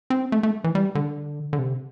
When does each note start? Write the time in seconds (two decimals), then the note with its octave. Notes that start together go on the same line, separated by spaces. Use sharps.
0.10 C4
0.32 A3
0.43 A3
0.64 E3
0.75 G3
0.95 D3
1.53 D3
1.59 C3